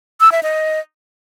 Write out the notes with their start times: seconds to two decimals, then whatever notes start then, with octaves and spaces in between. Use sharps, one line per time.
0.20 E6
0.32 E5
0.43 D#5